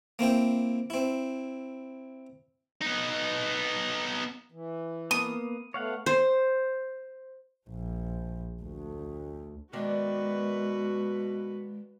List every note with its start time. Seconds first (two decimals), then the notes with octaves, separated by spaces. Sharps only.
0.19 A#3 C4 E4 G5
0.90 C4 E4
2.81 B3 D#4
4.52 E3
5.11 A#3 B3 D#6
5.74 A3 B3 C#5 F5 F#5
6.06 C5
7.69 A#1
8.63 D2
9.73 B2 D#3 G#3 A#3 D4 F#4 B4